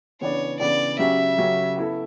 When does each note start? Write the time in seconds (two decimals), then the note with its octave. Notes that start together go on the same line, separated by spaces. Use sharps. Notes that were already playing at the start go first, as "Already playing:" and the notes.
0.21 C#3 E3 B3 D4 C#5
0.60 C#3 E3 B3 D4 D5
0.99 C#3 F#3 C#4 G4 E5
1.38 C#3 F#3 C#4 G4
1.77 B3 E4 A4